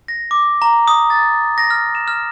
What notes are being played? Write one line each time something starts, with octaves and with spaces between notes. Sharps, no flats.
A#6
D6
A#5
D#6
A6
A#6
F6
E7
F6